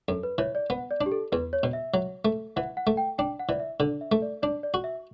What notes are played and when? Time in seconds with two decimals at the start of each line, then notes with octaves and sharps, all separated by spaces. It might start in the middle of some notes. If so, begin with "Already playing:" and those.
0.08 F#2 A4
0.23 B4
0.38 E3 C#5
0.55 D5
0.70 B3 F#5
0.91 D5
1.01 D4
1.06 G4
1.12 A4
1.32 E2 B4
1.53 C#5
1.63 B2
1.73 E5
1.94 F#3
2.25 A3
2.56 E3 F#5
2.77 F#5
2.87 A3
2.97 G5
3.18 D4 G5
3.39 F#5
3.49 E3 D5
3.60 E5
3.80 D3 D5
4.01 E5
4.12 A3
4.22 D5
4.42 D4 D5
4.63 D5
4.74 F#4
4.84 E5